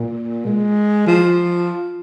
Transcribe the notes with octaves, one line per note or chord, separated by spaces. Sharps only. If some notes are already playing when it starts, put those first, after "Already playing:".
Already playing: A#2
G#3
F3